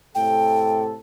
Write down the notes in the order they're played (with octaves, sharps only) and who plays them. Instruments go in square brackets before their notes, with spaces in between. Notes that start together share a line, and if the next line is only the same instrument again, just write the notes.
[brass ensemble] A2 C3 A4 [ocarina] G5